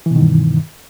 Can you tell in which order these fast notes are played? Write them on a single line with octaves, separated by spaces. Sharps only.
E3 B2 D#3 G2